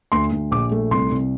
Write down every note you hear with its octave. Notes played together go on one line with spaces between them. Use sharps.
D2 C6
D2
A#1 D6
A3
C2 C6
C2